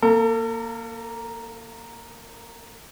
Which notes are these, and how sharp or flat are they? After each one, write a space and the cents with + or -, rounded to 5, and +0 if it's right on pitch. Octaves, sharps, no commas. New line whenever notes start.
A#3 +0 A4 +40